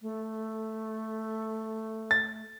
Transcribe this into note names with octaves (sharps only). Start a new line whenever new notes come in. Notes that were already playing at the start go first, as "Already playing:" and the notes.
A3
A6